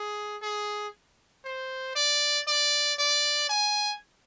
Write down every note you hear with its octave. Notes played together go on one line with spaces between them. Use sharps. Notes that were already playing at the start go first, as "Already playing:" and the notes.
Already playing: G#4
G#4
C5
D5
D5
D5
G#5